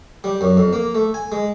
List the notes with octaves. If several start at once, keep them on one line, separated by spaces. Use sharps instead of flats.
G3
F#2
F2
A#3
A3
G#5
G#3